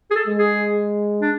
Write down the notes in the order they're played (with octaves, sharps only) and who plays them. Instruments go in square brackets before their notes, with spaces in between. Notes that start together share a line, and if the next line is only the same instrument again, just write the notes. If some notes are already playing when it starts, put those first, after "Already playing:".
[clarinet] G#4
A4
[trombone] G#3
[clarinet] G#4
D4